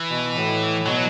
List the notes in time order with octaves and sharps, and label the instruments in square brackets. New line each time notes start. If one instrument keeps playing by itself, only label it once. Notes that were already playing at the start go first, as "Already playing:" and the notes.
Already playing: [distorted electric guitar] E3
[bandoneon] B2
A2
[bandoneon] B2 [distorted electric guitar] F#3